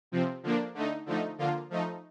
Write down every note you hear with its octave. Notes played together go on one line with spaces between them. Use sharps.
C3 F3 C4
D3 F3 A#3 D4
D3 A3 D#4
D3 F3 A3 D#4
D3 F3 A#3 F4
F3 A3 D#4